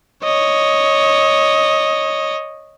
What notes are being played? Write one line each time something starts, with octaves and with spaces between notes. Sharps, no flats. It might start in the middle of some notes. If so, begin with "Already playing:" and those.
C#5 D#5